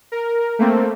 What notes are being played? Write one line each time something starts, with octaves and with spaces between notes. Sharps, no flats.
A#4
A3 A#3 C4